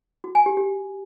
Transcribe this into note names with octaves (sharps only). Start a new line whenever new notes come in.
F#4
G#5
G4
G4